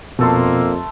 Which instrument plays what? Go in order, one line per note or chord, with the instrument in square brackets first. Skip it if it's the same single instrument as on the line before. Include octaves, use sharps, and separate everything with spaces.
[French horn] F2 [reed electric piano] B2 [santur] A3 A4 C6 [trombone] A#3